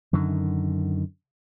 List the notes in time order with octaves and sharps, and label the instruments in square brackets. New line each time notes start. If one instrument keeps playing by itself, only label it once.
[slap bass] F#2 D3 D#3